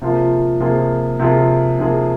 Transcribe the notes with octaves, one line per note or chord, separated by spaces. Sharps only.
C3 F3 A#3 F4 G#4
C3 F3 A#3 F4 G#4
C3 F3 A#3 F4 G#4
C3 F3 A#3 F4 G#4